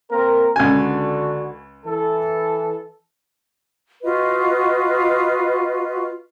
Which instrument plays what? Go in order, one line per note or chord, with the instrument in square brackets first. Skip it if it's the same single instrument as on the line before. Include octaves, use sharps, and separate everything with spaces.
[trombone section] A#3 C4 A#4
[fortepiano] C#2 G#5 [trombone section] D3 F#4
[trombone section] E3 A4
[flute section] F4 F#4 B4 D#5